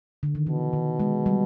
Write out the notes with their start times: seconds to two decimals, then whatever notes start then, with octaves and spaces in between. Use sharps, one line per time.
0.23 D3
0.35 D#3
0.47 B2 E3
0.73 D#3
1.00 G#3
1.26 G3